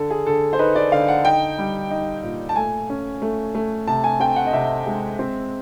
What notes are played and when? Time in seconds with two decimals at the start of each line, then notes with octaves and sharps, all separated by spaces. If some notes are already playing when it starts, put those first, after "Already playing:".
Already playing: D3 A4
0.11 G#4
0.26 D3 A4
0.53 C5
0.59 D#4 B4
0.75 D5
0.92 D3 F5
1.09 F#5
1.25 D#4 G5
1.58 G3
1.91 D#4
2.23 A#2
2.49 A5
2.56 A3 G#5
2.90 C#4
3.22 A3
3.55 A3
3.88 C3 A5
4.04 G#5
4.20 C4 G5
4.36 F#5
4.46 D#5
4.53 C3 E5
4.86 G#3
5.19 C4